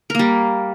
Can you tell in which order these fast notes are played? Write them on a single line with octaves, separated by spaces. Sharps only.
A#4 A#3 G3